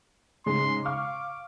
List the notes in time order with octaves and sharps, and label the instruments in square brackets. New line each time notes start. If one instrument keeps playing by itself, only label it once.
[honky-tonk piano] G#2 C#3 G#3 [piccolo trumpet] C6
[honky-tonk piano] F5 C#6 F6 [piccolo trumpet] D6